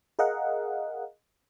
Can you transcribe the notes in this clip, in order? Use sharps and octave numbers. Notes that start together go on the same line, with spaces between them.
G#4 A#4 D#5 F5 F#5